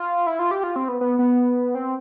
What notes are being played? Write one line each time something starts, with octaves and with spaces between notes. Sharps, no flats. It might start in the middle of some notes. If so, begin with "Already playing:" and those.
Already playing: F4
E4
F4
G4
F4
C4
B3
B3
B3
C4